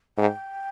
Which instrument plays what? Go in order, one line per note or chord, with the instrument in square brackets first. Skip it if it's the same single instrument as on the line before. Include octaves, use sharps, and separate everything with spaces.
[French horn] G#2 [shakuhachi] G5